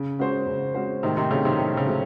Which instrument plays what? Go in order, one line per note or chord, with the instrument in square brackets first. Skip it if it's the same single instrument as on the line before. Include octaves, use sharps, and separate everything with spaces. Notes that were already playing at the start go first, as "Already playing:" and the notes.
Already playing: [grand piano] C#3
G#3 C#4 F#4 C5
C#3
G#3 C#4 F#4 C5
[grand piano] A2 [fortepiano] C3 D#3
[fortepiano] C3 D#3
[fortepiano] C#3 [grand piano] F#3 A3 C4 F#4
[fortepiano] C3 D#3
[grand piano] A2 [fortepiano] C3
[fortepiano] C#3
[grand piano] F#3 A3 C4